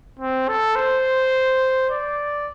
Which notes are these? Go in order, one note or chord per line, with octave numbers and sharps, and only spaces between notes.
C4
A4
C5
D5